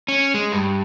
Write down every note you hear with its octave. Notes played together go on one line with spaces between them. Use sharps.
C#4
G#3
G2